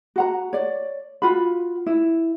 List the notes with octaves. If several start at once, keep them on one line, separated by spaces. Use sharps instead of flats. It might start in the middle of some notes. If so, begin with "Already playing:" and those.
F#4 F#5 A#5
C#5 D5
F4 F#4 B5
E4